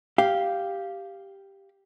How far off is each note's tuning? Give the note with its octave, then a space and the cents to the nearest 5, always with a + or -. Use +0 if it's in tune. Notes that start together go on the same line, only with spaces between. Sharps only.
G4 +0 F5 -5